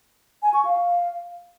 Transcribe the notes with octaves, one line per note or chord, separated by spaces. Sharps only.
G#5
C#6
F5